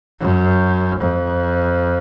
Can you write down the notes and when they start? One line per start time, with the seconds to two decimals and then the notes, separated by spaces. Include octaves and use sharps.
0.21 F#2
1.00 F2